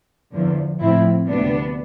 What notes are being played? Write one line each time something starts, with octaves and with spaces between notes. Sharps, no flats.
E2 D3 F3
A2 F3 C4 E4
D2 C3 G3 B3 D4